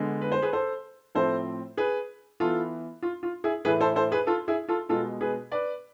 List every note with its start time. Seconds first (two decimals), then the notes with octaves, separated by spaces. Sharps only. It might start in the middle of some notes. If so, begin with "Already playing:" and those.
Already playing: D3 G#3 B3
0.21 B4
0.32 C5
0.42 G#4 B4
0.53 A4 C5
1.15 A2 F3 A3 C4 A4 C5
1.77 G#4 B4
2.40 E3 B3 F4 A4
3.02 F4
3.23 F4
3.44 E4 G#4
3.65 A2 E3 A3 G#4 B4
3.81 A4 C5
3.96 A4 C5
4.12 G#4 B4
4.27 F4 A4
4.48 E4 G#4
4.69 F4 A4
4.89 B2 G#3 B3 F4 A4
5.21 G#4 B4
5.52 B4 D5